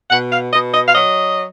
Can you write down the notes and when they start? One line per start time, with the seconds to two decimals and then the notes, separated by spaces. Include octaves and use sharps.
0.10 B2 F#5
0.31 F5
0.52 B2 D#5
0.74 D#5
0.87 F5
0.94 F#3 D#5